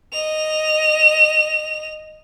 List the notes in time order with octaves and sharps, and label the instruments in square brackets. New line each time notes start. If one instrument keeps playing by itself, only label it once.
[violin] D#5 F7